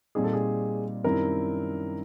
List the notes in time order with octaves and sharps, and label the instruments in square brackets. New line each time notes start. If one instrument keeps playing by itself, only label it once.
[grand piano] A#2 G3 C4 D#4 [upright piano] G#4
[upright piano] A4
G#4
[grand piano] F#2 D#3 G3 C4 E4 [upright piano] A#4